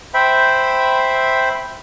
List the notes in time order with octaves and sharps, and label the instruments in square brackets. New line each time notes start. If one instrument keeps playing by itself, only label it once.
[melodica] C5 E5 G5 B5